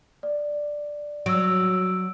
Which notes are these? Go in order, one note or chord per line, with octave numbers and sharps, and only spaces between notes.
D5
F#3 E6 D7